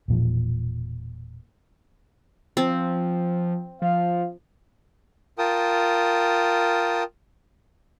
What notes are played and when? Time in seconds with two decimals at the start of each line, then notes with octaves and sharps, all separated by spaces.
0.08 E1 A#2 F3
2.57 F3 C4
3.82 F3 F5
5.38 F4 A#4 G5 A5 D#6